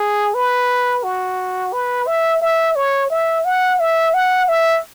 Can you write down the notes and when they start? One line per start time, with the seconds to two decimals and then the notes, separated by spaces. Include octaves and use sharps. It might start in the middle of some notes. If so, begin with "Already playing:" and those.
Already playing: G#4
0.35 B4
1.04 F#4
1.73 B4
2.07 E5
2.42 E5
2.76 C#5
3.10 E5
3.45 F#5
3.80 E5
4.14 F#5
4.49 E5